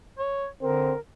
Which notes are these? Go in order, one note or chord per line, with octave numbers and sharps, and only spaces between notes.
C#5
D3 C4 A#4